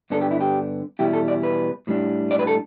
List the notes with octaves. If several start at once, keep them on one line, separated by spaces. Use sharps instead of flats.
G2 D3 B3 D4 A4
G4
E4
G4
E2 B2 G3 E4 G4
A4
D5
B4
A2 G3 D4
D5
B4
A4